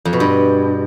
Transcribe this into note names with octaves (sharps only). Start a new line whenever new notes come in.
F2
B2
G2